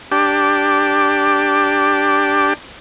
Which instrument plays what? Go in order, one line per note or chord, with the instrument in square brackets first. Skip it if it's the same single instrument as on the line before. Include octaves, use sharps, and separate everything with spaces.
[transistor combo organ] D4 G4